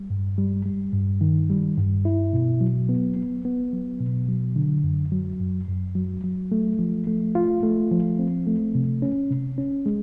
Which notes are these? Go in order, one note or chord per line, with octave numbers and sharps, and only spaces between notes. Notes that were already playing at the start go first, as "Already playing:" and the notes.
Already playing: G3
G2
G3
G3
G2
D#3
G3
G2
E4
B2
F#3
B3
B3
B3
F#3
B2
F#3
D3
F#2
F#3
F#2
F#2
F#3
F#3
A3
F3
A3
F4
A3
F3
C4
A3
C3
C#4
C3
C#4
G#3